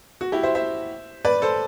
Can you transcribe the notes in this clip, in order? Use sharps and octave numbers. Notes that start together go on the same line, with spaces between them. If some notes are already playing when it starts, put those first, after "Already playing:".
F#4
E4 G4
C5 E5
C5 E5
B4 D5
A4 C5